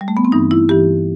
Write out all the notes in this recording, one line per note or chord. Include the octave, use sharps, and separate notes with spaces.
G3
A3
B3
C4
G2 E3 D#4
E4
G2 E3 G4